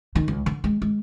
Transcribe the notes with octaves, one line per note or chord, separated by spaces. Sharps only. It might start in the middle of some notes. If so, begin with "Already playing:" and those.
D#3
C#2
D3
G#3
G#3